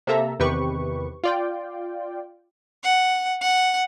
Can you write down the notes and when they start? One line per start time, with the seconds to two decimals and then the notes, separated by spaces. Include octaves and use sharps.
0.07 C3 A#3 A4 E5 A#5
0.39 E2 C3 D#3 G4 B4 C#6
1.24 F4 D5 G5
2.83 F#5
3.41 F#5